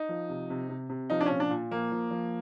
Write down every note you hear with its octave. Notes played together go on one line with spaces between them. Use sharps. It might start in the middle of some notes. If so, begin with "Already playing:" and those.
Already playing: D#4
F3
C3
C3
C3
C3
F3 D#4
D4
A#2 C#4
D4
A#2
F3 A#3
F3
F3